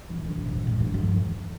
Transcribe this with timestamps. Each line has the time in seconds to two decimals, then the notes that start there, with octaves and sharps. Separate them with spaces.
0.10 E3
0.24 D3
0.38 C3
0.53 B2
0.67 A2
0.80 G2
0.94 F2
1.16 E2